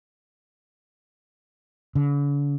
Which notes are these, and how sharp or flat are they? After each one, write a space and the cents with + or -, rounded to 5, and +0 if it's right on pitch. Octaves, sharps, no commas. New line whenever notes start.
D3 -45